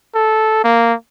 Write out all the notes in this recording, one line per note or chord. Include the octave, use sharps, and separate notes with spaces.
A4
A#3